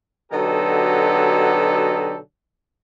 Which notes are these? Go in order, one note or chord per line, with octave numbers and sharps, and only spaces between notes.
B2 D3 F#3 D#4 G4 A4